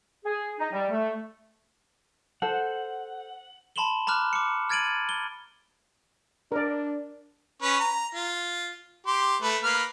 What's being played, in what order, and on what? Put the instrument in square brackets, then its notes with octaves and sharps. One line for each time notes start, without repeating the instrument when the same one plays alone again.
[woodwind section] G#4
D#4
G3
A3
[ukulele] A4 C5 [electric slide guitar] F#5
[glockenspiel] A5 B5 C6 E7 F#7 G7
A#5 B5 D6 F6 F#6
D6 C#7
F6 G#6 A6 D7 D#7 F#7
G7
[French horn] D4 [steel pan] A#4 D5
[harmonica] C#4 B4 C#5
A#5
F4
G4 C6
A3 B4
A#3 B4 F6